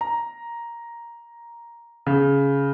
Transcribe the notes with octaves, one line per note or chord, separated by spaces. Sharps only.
A#5
C#3